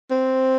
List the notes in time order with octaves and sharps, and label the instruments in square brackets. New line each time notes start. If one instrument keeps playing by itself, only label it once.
[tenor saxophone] C4